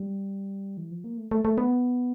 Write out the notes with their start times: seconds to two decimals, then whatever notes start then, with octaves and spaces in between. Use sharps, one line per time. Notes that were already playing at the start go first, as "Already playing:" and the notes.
Already playing: G3
0.77 E3
0.91 F3
1.04 A#3
1.17 A3
1.31 A3
1.45 A3
1.58 B3